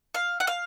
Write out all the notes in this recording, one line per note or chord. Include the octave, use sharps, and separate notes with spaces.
F5
F#5
F5